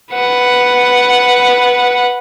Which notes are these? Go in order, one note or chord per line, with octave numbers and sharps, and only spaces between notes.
B4 F#5